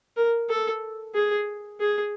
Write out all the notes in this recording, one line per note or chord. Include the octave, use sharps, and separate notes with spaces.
A#4
A4
G#4
G#4